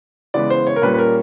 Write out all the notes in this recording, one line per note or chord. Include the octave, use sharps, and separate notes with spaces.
C#3 E3 G#3 B3 D5
C5
C#5
A#4
A#2 G3 A#3 C#4 B4
B4
A#4